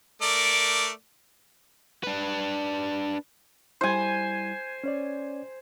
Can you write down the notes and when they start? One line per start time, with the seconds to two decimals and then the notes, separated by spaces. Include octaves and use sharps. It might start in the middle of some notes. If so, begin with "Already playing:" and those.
0.22 A3 A#4 D5
2.03 D4 B4
3.81 G3 E4 C5 G#5
4.84 C#4 C#5 D5